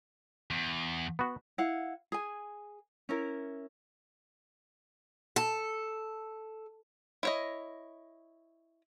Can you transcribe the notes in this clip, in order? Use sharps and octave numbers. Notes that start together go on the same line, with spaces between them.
E2
B3 F#4
E4 F5 F#5
G#4 G#5
C#4 E4 A#4
A4
E4 C#5 D#5